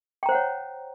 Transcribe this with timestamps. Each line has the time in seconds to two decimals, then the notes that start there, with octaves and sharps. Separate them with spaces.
0.23 G5
0.26 A#5
0.29 C5
0.32 F#5
0.35 C#5